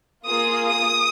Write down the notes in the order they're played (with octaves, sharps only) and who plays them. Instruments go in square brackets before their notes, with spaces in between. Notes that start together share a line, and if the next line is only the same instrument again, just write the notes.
[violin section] A#3 F4 G#4 D#6
D#6